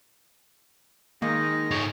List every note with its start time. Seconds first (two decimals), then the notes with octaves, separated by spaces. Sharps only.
1.22 D#3 G#3 A#3 D#5
1.71 G#2 C#5